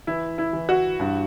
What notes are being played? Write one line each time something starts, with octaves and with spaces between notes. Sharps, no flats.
E3 E4
E4
E3
F#4
G2